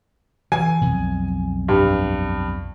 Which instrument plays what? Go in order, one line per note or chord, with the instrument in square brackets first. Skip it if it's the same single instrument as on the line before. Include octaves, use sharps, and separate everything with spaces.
[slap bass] E3 [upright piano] G#5
[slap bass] B1 F2
[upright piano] G2